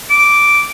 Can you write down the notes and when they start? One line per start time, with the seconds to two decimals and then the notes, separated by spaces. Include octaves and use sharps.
0.10 D6